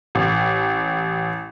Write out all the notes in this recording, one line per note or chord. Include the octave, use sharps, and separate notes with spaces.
A1